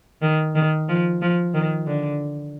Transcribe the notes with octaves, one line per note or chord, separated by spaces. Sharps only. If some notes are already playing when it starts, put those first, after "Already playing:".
D#3
D#3
F3
F3
D#3
D3